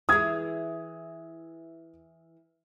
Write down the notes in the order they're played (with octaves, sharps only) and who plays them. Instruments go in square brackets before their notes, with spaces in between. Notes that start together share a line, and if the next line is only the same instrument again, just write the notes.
[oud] E3 G#4 [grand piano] D#6 G#6